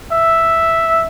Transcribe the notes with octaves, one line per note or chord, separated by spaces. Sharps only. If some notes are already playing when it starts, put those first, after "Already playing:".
E5